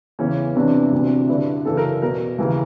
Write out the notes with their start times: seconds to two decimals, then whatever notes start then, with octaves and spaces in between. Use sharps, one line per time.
0.19 E2 C#3 E3 C#4
0.56 E2 C3 E3 D4
0.92 D2 C3 E3
1.29 G2 D3 E4
1.65 F#2 C#3 E3 A4
1.77 A#4
2.02 E2 B2 A#4
2.38 D#2 C#3 E3